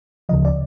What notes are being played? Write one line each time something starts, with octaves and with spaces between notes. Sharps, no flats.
D2 C#3 F3 D#5
D5